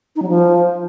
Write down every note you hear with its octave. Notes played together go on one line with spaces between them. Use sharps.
D#4
F#3
F3